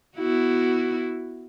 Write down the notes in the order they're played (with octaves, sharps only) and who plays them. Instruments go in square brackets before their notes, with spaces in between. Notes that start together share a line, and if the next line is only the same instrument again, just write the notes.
[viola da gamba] B3 E4 F#4